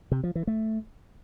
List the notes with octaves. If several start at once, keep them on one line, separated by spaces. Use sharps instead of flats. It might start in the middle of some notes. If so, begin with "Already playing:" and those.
C3
F3
E3
A3